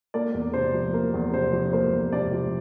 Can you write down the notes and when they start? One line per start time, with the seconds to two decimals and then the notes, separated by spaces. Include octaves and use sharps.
0.14 A#3 D5
0.34 E2
0.54 C3 C5
0.73 F3
0.93 A#3 A#4
1.14 E2
1.33 C3 C5
1.52 F3
1.73 A#3 C5
1.93 E2
2.13 C3 D5
2.32 F3